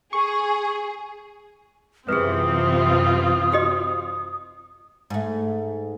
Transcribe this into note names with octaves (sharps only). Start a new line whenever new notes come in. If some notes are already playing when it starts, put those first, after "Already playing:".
G#4 C#6
F#2 C3 E3 C4 F4 G#4 B4 D#6
F#4 G4 D#5
G#2 A3